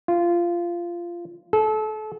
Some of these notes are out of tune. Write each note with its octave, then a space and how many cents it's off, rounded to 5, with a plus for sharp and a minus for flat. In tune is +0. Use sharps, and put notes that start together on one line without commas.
F4 -15
A4 -30